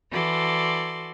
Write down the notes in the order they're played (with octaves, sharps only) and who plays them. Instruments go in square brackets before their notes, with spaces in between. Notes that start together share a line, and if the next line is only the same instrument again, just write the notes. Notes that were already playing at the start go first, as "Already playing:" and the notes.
[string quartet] E3 F#4 A4 D5 C6